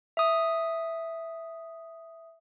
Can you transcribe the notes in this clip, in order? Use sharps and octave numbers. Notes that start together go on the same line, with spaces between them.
E5 D#6